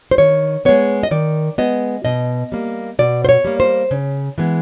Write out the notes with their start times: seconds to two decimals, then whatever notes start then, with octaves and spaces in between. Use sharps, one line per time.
0.11 C5
0.18 D#3 C#5
0.65 G#3 B3 C#5
1.03 D#5
1.11 D#3 D5
1.58 G#3 B3 D#5
2.05 B2 D#5
2.52 G3 A#3
2.99 B2 D5
3.25 C5
3.29 C#5
3.45 G3 A#3
3.60 C5
3.91 C#3
4.38 E3 G#3 B3